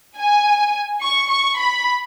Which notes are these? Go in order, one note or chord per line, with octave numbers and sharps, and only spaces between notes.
G#5
C#6
C#6
B5